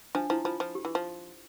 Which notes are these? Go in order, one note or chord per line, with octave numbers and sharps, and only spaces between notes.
F3 D4
F3 E4
F3 F4
F3
G4
E3
F3